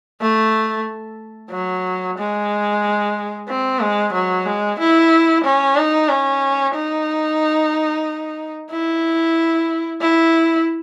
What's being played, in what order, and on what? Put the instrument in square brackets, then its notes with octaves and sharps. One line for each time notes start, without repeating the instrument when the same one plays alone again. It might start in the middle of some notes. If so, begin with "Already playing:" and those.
[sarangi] A3
F#3
G#3
C4
G#3
F#3
G#3
E4
C#4
D#4
C#4
D#4
E4
E4